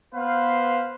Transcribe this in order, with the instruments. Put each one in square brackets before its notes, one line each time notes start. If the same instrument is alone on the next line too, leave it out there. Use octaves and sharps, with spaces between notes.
[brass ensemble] B3 B4 C5 F5